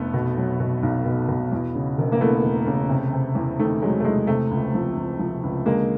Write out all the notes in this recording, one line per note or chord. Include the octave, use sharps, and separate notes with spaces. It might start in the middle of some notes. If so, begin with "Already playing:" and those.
Already playing: F1 A3 B3
B2
F#3
B2
B1
B2
B2
E2
C#3
E1
A#3
E3 A3 B3
E1
C#3
C3
C3
E2
D#3 A3
F#3 G#3
A3
E2 G#3
C3 A3
C#2
F3
C#2
F3
C#2
D3 G#3 A#3